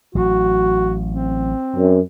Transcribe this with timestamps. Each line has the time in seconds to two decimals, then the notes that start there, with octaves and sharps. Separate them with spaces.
0.15 A1 F#3 F#4
1.08 C4
1.76 F#2